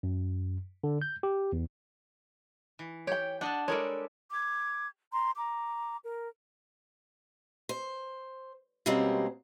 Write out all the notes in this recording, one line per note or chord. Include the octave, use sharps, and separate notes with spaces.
F#2
D3
G6
G4
E2
E3
G4 C#5 G5
D4 D#5 F#5 A5
G3 G#3 A4 A#4 C#5
D6 G#6
A#5 C6
A#5 D6
A#4
C5
B2 G3 G#3 A#3 C4 C#4